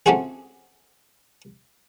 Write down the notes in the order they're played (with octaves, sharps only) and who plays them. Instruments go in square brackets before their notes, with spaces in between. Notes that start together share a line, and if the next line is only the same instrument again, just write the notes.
[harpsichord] A3 C4 C#4 F4 F#4 G#4